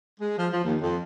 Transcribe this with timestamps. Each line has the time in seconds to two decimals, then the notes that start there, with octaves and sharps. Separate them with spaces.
0.20 G#3
0.38 F3
0.53 F3
0.65 D#2
0.82 F2